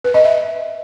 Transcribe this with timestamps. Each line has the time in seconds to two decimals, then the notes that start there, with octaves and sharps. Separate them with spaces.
0.04 B4
0.14 D#5
0.24 E5